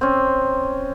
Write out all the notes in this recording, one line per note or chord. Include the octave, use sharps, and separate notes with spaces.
C4 C#4